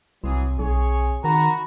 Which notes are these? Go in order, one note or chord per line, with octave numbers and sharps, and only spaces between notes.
C2 E3 F#3 C4 G#4
B1 G#4 C#5
D#3 F#4 A#5 B5